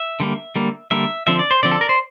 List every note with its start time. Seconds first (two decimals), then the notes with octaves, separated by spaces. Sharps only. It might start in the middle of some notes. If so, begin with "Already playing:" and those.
Already playing: E5
0.20 D3 G3 A#3
0.56 D3 G3 A#3
0.91 D3 G3 A#3 E5
1.27 D3 F3 C4 E5
1.39 D5
1.51 C5
1.63 D3 F3 C4 D5
1.72 A4
1.81 A#4
1.89 C5